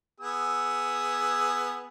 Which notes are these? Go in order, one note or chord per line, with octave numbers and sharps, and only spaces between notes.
B3 G#4 E6